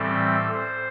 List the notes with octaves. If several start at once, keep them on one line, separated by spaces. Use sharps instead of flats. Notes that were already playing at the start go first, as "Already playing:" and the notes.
Already playing: A2 E3 G3 C4 A4
C5